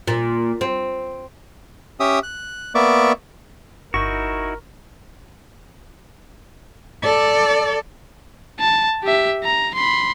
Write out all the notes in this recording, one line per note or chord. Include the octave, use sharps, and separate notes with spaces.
A#2
C4
C#4 G4 E5 D#6 E6
F#6
A#3 B3 D5 E5 C#6 D6
G1 D#4 E4 F#4 A#4 C#6
A4 D5
A5
G4 E5
A#5
B5 C6